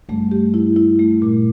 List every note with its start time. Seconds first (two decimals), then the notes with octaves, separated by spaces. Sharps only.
0.09 G2 A3
0.31 G4
0.54 E4
0.76 E4
0.99 A3
1.22 A#2